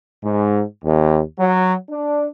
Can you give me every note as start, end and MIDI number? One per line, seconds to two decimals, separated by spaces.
0.24 0.62 44
0.84 1.21 39
1.39 1.74 54
1.90 2.27 62